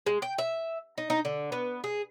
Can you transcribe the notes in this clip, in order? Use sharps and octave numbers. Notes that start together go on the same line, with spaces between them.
G#3
G5
E5
D#4
D#4
D3
B3
G#4